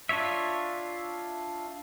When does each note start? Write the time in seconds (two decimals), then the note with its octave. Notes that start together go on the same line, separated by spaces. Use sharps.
0.09 D4 F4 C#5 E5